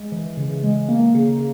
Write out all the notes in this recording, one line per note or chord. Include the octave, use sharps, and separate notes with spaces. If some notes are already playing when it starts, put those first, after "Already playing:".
Already playing: G#3
E3
C#3
G#3
A#3
C#3